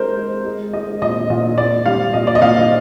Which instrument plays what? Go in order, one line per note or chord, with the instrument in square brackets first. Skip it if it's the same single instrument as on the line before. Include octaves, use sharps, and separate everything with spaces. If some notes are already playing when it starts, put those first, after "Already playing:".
Already playing: [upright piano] G#3 A#4 C5
G#3
G#3
G#3 D#5
A#2 D#5
A#2 D#5
A#2 D5
G3 F5
A#2 D#5
D5
D#5
A#2 F5